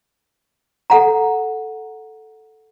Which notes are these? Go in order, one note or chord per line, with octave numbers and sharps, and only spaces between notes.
A4 F#5 A#5